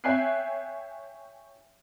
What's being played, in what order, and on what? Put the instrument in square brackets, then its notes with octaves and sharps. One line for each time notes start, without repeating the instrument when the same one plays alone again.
[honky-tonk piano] C#5 E5 G5 G#5 F#6 C7